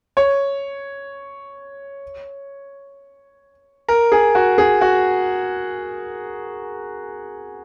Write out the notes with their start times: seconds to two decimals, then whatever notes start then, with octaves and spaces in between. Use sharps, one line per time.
0.17 C#5
3.89 A#4
4.12 G#4
4.35 F#4
4.58 G#4
4.81 F#4